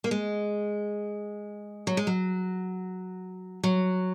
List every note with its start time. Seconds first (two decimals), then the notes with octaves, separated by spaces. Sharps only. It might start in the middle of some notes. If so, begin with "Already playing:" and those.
0.04 A#3
0.11 G#3
1.87 F#3
1.97 G#3
2.07 F#3
3.63 F#3